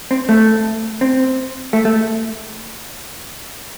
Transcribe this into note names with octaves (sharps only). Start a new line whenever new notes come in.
C4
A3
C4
A3
A3